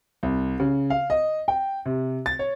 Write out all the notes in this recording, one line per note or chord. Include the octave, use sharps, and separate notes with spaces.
C2
C#3
F5
D#5
G5
C3
A6
C#5